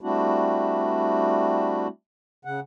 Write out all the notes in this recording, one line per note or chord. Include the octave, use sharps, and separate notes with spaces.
G3 A3 C4 D4 E4 F#4
C#3 F#5